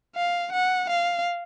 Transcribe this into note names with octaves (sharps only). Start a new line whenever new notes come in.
F5
F#5
F5